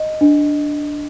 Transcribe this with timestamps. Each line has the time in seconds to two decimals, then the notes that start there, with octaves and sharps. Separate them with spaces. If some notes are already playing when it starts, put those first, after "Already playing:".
Already playing: D#5
0.21 D4